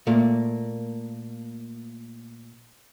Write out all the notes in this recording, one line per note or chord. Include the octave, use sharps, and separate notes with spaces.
A#2 A3 A#3